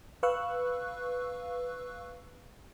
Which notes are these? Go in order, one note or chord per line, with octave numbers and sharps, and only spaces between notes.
B4 F5 C#6 E6 F#6